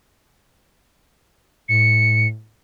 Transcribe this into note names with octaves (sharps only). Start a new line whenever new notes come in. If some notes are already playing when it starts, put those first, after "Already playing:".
A2 C#7